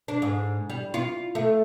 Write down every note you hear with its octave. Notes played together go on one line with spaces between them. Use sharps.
D4
G#2
G3
F4
A3